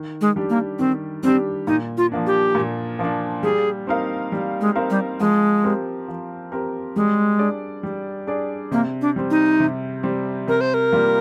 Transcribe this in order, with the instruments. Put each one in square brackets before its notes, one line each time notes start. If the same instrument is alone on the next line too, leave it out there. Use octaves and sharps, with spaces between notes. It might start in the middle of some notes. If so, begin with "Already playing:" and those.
Already playing: [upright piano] D#3
[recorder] G#3
[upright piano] G3 D4 G4
[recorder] A#3
[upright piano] D#3 [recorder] C4
[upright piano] G3 D4 G4 [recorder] C4
[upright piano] A#2 [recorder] D#4
[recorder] F4
[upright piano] F3 A#3 D4
[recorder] G4
[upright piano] A#2
F3 A#3 D4
[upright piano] G3 [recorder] G#4
[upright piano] C4 D#4 A#4 F5
G3
[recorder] G#3
[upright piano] C4 D#4 A#4 F5
[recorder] G3
[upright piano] F3 [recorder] G#3
[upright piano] C4 G4 A#4
F3
C4 G4 A#4
[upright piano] G3 [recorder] G#3
[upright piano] D4 G#4 D5
G3
D4 G#4 D5
[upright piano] C3 [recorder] A#3
[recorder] D4
[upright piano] G3 C4
[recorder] D#4
[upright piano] C3
G3 C4
[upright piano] C3 [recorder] A#4
[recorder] C5
A#4
[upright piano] G3 A#3 F4